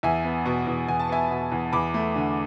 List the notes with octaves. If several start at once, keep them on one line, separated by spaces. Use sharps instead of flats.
E2 E5 G#5
B3
B2
E2
E2 G#5
A5
B3 E5 G#5
B2
E2
E2 B5 D6
A3
D3